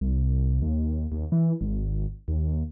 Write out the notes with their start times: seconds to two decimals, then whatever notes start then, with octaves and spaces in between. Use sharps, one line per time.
0.01 C2
0.62 D#2
1.12 D#2
1.32 E3
1.61 G#1
2.28 D#2